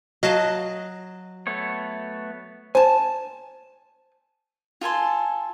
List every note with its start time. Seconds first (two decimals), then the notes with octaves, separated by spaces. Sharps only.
0.23 F#3 D#5 F5 A5
1.47 A3 B3 C#5
2.75 C5 G#5 A5
4.81 F4 A4 G#5 C6